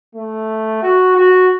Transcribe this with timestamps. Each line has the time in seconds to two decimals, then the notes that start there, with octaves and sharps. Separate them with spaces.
0.15 A3
0.82 F#4
1.16 F#4